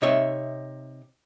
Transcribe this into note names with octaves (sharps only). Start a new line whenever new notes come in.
C3 D#4 C#5 E5